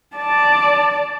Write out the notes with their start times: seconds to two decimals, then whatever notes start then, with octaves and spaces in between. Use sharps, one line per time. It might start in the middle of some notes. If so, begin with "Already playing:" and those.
0.17 D5 A5